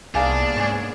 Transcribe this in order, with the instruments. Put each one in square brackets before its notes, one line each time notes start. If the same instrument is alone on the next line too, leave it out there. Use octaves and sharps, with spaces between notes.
[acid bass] C2 [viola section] A#3 B3 G#4 [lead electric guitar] D4 [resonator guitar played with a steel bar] D#4 F5 G#5
[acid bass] G#2 [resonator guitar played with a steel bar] C#5 D5 G#5